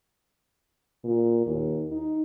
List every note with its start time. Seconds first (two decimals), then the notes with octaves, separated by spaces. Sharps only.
1.04 A#2
1.47 D#2
1.91 D#4